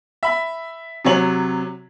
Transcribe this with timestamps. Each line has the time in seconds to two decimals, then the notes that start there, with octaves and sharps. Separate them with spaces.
0.23 E5 B5
1.05 C3 F#3 C#5 F#7